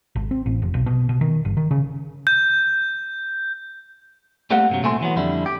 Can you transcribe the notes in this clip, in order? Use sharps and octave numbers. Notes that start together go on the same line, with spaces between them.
G#1
C4
A1
F1
B1
B2
B2
D#3
G1
D#3
C#3
G6
G3 A3 A#3 C4 G4 F#5
G2 C3 F#3
C2 A#2 A3 C4 G#5 C6
E3 F#3 B3
F2 D3 G3 E4
G4